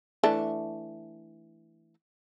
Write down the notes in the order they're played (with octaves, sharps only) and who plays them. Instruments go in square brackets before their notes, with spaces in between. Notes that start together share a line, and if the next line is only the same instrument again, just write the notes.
[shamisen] E3 A3 D4